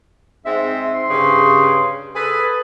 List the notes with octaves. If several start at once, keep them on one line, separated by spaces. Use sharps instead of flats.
G#2 G#3 C4 E5
C6
G2 C#3
G#4 A4 B4